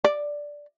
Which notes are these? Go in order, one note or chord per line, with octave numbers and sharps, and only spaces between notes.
D5